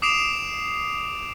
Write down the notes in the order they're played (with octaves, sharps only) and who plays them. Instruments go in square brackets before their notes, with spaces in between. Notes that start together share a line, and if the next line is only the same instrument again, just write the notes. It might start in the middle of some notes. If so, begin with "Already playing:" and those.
[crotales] D6 D#6 C7 D7 E7 F7